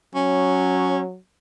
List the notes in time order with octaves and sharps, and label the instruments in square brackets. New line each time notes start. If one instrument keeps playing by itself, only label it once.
[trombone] F#3 [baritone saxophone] C#4